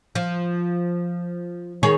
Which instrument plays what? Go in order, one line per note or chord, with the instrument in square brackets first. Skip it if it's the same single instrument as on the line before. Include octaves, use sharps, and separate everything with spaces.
[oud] F3
D#3 G#4 C#5